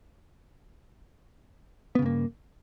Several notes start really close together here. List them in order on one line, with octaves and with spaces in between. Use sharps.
B3 C#3 G2 A#3